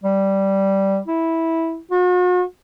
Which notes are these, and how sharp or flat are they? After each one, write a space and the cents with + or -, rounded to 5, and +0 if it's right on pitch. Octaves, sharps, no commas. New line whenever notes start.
G3 -10
E4 -10
F#4 -45